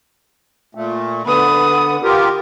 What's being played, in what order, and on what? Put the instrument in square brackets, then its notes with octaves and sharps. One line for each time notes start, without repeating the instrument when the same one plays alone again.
[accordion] A#2 A3
[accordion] D3 B3 [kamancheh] B4 D#6
[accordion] F4 G4 A#4